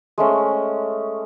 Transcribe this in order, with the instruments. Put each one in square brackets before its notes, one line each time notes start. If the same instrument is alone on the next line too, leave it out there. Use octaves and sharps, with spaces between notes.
[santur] G#3 A3 C#4